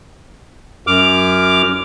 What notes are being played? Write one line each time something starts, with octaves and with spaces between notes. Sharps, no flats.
F#2 D6 F6